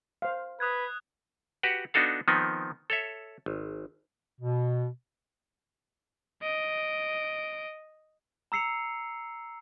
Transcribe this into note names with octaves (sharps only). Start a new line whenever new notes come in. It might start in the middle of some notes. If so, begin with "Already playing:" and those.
C5 F5
B4 D#6 F#6 G#6
F#4 G4 B4 F#5
B3 D4 D#4 F#4 A4 F5
D#3 F3 B3 C4 D#4
A4 C#5 E5
G#1
B2
D#5 D7
A#5 E6 C7 C#7 F7